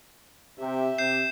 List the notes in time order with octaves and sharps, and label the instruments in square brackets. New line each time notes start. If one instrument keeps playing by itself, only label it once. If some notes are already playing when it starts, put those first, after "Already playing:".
[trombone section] C3 [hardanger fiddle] G4 E5
[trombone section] C3 [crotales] G6 C7 E7